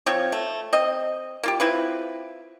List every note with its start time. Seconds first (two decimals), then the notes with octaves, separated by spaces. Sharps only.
0.06 F3 C4 C#5
0.32 A3
0.73 C4 D#5
1.43 A#3 F4 G4
1.60 C4 E4 F4 B4